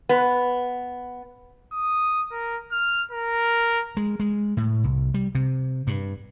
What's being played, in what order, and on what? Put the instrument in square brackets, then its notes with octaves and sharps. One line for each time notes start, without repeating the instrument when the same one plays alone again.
[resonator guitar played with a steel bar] B3
[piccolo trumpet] D#6
A#4
F6
A#4
[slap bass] G#3
G#3
A2
C2
G3
C3
G2